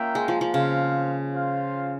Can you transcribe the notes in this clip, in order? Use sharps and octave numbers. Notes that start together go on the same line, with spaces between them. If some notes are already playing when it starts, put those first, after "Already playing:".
Already playing: A#3 C#4 F4 A#4 E5 G5
G#3
F3
F3
C#3 C4 F4 C5 F5
F4 C5 F5